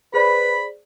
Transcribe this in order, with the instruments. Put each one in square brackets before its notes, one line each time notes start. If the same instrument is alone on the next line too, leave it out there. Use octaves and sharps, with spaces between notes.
[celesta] G#4 C5 D5 [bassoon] B4 [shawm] B5